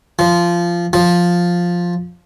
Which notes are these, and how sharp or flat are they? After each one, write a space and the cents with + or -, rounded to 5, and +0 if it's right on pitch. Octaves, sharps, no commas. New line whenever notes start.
F3 -15
F3 +5